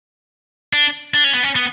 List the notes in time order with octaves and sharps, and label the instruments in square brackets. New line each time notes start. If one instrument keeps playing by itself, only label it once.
[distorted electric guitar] D4
D4
C#4
B3
C#4
B3